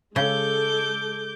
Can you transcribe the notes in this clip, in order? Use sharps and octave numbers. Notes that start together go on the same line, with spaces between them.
C#3 G#3 A4 D6 G6